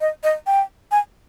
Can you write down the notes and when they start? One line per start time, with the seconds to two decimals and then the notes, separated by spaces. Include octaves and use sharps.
0.01 D#5
0.24 D#5
0.47 G5
0.91 G#5